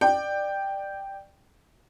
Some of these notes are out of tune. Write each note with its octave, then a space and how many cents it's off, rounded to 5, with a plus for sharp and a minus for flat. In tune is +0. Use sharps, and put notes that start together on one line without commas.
D5 +20 G5 +0